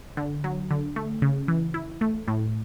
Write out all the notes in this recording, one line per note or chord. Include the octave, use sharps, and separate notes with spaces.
D3
F#3
D3
A3
C#3
E3
E4
A3
A2